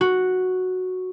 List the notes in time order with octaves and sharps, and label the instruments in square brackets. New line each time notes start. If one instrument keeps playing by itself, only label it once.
[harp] F#4